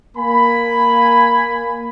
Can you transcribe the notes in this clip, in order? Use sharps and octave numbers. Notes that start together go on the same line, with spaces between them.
A#3 G#5 B5